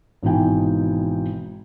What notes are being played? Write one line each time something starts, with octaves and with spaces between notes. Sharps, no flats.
G#1 B2 E3 D#4 G5 G#5